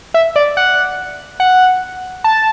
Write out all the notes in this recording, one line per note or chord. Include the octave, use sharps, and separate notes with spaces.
E5
D5
F#5
F#5
A5